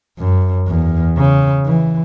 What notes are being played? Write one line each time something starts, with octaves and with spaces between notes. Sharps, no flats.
F#2
E2
C#3
E3